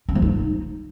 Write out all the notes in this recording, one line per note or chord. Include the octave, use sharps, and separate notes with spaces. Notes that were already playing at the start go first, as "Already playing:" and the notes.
C#4
F3
D#4